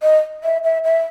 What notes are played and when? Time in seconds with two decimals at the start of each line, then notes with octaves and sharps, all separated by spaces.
0.03 D#5
0.44 E5
0.64 E5
0.84 E5